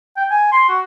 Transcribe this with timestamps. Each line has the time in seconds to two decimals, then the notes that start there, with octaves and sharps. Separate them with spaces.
0.17 G5
0.30 G#5
0.52 C6
0.69 F#4